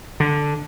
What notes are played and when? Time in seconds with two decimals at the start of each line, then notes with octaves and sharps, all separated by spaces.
0.20 D3